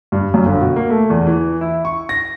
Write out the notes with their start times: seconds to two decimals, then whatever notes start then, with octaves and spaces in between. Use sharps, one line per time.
0.12 G2
0.34 F#2
0.46 G1
0.61 B2
0.76 A#3
0.90 A3
1.10 E2
1.27 E3
1.61 E4
1.85 C#6
2.09 A#6